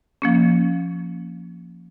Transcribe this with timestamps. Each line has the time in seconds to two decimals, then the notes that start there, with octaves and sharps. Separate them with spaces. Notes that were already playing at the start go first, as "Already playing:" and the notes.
0.22 F3 A#3 C#4